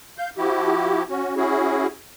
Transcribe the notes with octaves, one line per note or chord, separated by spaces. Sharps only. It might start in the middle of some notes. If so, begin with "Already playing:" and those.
F5 G6
F3 E4 F#4 G4
C#4 F#4
C#4 E4 F#4 G#4